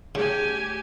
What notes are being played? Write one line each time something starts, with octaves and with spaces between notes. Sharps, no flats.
C#3 A3 G4 G#5